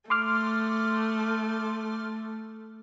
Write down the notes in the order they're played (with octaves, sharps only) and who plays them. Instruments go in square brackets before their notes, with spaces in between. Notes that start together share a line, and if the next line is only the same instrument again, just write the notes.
[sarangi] A3 [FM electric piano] C6 D6 F6